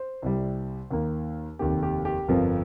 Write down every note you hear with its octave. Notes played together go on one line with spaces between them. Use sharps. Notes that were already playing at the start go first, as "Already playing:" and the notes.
Already playing: C5
C2 C3 G3
D#2 D#3 A#3
F1 D#2 D#3 A#3 G4
G4
G4
G1 F2 F3 A#4